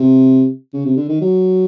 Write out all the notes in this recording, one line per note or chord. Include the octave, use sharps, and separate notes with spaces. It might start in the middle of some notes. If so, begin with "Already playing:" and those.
Already playing: C3
C#3
C3
D3
D#3
F#3